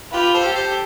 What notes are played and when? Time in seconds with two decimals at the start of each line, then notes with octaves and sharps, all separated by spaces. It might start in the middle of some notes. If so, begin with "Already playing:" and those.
0.12 F4 G4 B4
0.34 A4 C5
0.45 G4
0.55 A4 C5